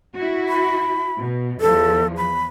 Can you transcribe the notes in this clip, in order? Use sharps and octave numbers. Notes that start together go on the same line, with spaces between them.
E4 F#4
B5
B2
E2 F3 A4
B5